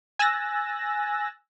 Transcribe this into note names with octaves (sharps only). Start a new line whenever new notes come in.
G#5 E6 F#6 A6 A#6